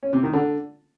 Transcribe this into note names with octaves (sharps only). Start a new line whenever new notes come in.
C#4
C3
D#3
D3